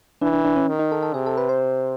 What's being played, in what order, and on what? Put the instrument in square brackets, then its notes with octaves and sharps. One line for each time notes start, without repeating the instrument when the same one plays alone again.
[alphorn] E3 [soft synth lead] D4
[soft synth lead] D4
D4
C#4
[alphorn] D#3
[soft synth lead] D#4
A4
A4
[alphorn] C3 [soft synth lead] G#4
[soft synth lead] A4
B4
C5